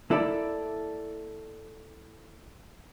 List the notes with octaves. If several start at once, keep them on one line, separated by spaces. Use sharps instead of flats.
A#3 E4 A4 D5